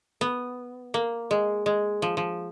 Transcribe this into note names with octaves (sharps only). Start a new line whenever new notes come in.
B3
A#3
G#3
G#3
F3
F3